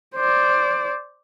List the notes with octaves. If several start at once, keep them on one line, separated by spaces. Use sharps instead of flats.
C5 D5